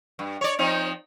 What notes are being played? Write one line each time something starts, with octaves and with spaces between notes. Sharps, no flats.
G2
C#5 D5
F3 C4 D#4